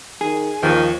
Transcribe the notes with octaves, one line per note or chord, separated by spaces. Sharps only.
D#3 G#4
D#2 D#3 F3